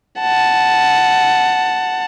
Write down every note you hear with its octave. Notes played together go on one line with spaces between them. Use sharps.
F#5 A5